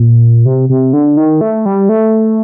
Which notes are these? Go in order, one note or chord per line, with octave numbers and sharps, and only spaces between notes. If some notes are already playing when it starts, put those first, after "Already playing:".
Already playing: A#2
C3
C3
D3
D#3
A3
G3
A3